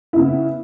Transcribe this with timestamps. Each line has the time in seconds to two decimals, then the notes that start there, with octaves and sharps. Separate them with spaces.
0.13 E4
0.16 C#3
0.19 B3